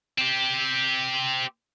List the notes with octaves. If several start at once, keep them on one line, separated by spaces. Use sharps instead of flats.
C4 G4